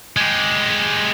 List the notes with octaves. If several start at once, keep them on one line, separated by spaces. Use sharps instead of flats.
G#3 G4